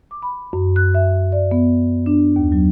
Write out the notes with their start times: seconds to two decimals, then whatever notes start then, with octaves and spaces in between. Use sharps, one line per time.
0.11 D6
0.22 B5
0.53 F#2
0.76 F#6
0.94 E5
1.32 D5
1.51 B3
2.06 D4
2.36 D#2
2.52 F#3